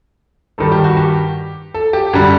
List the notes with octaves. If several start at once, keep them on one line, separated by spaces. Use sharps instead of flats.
G2 D#3 G3 A4
G4
F#4
G4
A4
G4
F#2 D3 G3